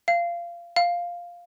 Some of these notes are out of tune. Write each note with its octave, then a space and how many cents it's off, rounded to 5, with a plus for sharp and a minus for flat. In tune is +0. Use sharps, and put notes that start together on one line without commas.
F5 -20
F5 +0